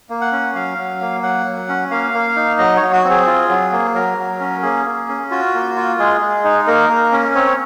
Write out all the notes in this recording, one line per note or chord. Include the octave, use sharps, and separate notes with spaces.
A#3
F#5
C#4
F#3 F5
F#3
A#3
F#3 F#5
F#3
C#4
A#3 F5
A#3
D#4
F#3 D#5
F#3 C#5
F#4
C4
G#4
F4
F#3
A#3
F#3 A#4
F#3
C#4
A#3 G#4
A#3
C#4
F4 F#4
A#3
F4
G#3 G#4
G#3
D#4
A#3 A#4
A#3
C#4
C4 C#5